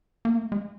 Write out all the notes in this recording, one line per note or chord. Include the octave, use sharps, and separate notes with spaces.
A#3
A3
G#3